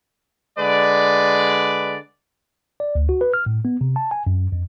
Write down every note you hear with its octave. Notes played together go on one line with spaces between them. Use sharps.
D3 G#3 B4 D5
D5
D2
F#4
B4
F6
A2
B3
C3
A5
G#5
F#2
F2